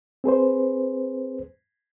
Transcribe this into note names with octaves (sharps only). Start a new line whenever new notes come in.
C4 G#4 B4 C5